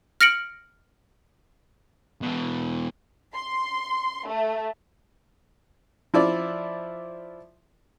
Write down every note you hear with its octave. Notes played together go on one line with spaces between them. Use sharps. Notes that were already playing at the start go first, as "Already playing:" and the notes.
F6 A#6 C#7 D7 F#7
B2 E3
C6
A3
F3 E4 D5